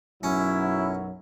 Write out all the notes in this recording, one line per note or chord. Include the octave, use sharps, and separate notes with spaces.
B1 F#2 F#3 C#4 E4